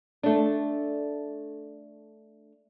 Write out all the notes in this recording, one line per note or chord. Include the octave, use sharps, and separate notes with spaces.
A3 D4